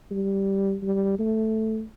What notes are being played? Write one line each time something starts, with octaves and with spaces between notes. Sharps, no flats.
G3
G3
A3